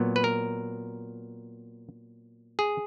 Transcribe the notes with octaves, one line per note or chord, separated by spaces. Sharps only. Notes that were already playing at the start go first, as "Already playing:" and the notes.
Already playing: A#2 F#3 B3
B4
A#4
G#4